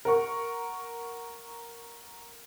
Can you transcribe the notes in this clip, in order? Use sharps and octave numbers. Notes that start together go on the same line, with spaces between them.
A#4 F#5 C#6